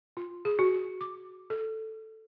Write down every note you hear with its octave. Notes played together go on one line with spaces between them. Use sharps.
F4
G#4
F#4
D6
A4